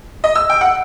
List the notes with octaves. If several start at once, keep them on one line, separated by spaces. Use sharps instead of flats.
D#5
E6
G5
F#5